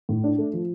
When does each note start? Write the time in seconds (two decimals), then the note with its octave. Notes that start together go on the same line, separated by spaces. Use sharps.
0.09 A2
0.24 D4
0.38 A3
0.53 F3